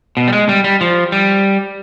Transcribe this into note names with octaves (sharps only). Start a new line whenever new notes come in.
B2
G3
G#3
G3
G3
F3
G3